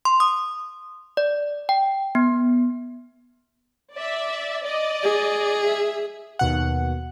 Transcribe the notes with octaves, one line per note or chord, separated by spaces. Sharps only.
C6
D#6
D5
G5
B3
D5 E5
D5 D#5
G#4
E5
D#2 B2 F#5